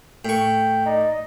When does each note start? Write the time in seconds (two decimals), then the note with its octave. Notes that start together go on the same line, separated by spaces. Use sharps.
0.25 A2 G5 C#6
0.86 D#4 D5
1.09 D#5